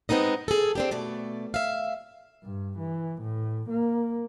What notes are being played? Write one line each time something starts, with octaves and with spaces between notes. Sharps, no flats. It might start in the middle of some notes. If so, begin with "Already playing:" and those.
G#3 B3 C4 D#4 D#5
G#4 A4
C4 D4 G4
B2 A3 D5
E5 F5
G2
E3
A2
A#3